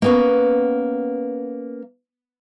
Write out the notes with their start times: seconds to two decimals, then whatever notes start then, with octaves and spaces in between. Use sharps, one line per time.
0.02 A#3 B3 C#4